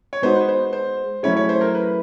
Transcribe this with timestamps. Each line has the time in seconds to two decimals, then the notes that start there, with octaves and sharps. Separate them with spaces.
0.13 C#5
0.22 G#3 B3 D#4 F#4 C5
0.35 B4
0.48 C5
0.73 C5
1.23 F#3 A3 C#4 E4 G#4 C#5
1.37 C#5
1.49 C5
1.61 A#4
1.75 B4